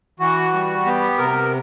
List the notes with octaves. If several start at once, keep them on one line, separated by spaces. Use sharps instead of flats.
E3 F#4
G3
B3 G4
C3 A#4